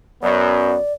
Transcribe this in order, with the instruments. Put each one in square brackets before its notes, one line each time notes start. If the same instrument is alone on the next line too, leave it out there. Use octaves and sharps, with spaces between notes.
[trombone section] F#2 B3 [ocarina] D5